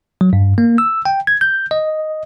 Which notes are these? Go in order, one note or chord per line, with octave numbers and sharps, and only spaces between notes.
F#3
G2
A#3
E6
G5
G#6
G6
D#5